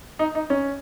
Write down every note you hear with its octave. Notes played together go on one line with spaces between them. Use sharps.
D#4
D#4
C#4